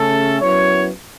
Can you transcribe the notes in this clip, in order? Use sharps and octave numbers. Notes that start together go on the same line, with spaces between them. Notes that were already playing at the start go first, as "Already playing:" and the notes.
Already playing: C#3 A3 C#4 A4
F#2 F#3 B3 E4 C#5